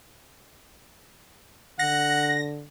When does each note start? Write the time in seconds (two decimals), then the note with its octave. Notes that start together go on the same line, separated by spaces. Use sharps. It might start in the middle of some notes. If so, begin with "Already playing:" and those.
1.79 D3 F#5 A#6